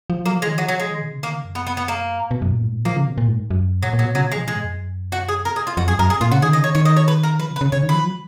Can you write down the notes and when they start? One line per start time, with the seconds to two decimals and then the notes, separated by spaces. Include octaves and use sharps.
0.10 F3
0.26 F#3 A#3
0.36 F3
0.42 G#3
0.47 D#3
0.57 F3 F#3
0.68 F#3
0.80 G#3
0.91 D#3
1.02 B2
1.12 C#3
1.23 D#3 A#3
1.33 C#3
1.45 F#2
1.55 B3
1.67 B3
1.77 B3
1.88 A#3
2.20 G#2
2.31 B2
2.42 F#2
2.53 A#2
2.64 G#2
2.74 A#2
2.85 F3 A#3
2.96 C#3
3.07 B2
3.18 A#2
3.28 G#2
3.51 F#2
3.83 A#2 F#3
3.93 A#2
3.99 F#3
4.04 B2
4.15 C#3 F#3
4.26 B2
4.32 G#3
4.37 F3
4.48 B2 G#3
4.56 G#2
4.64 F2
4.72 F#2
5.12 F#4
5.28 G#4
5.45 A#4
5.56 G#4
5.67 F4
5.77 F2 F#4
5.88 F#2 G#4
5.99 F#2 A#4
6.10 G#4
6.21 A#2 F4
6.31 C#3 F#4
6.42 D#3 G#4
6.53 C#3 D#5
6.64 D#3 C#5
6.75 D#3 C#5
6.85 D#5
6.97 C#5
7.08 B4
7.23 A#4
7.39 F3 B4
7.51 C#3
7.56 B4
7.61 C#3
7.72 C#3 C#5
7.83 D#3
7.89 F3 B4
8.05 F#3